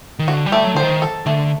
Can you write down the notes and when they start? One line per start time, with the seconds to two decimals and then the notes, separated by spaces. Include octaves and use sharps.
0.19 D#3
0.28 D3 F#4
0.46 G3
0.52 A3
0.64 F#3
0.74 D3 C5
0.83 D#3
1.02 A4
1.26 D3 A3